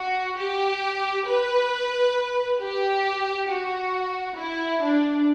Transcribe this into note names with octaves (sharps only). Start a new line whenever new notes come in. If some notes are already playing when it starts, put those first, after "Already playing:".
Already playing: F#4
G4
B4
G4
F#4
E4
D4